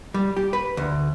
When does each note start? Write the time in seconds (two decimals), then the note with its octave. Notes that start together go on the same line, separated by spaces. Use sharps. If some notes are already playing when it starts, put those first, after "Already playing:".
0.14 G3
0.37 G4
0.53 B4
0.77 D2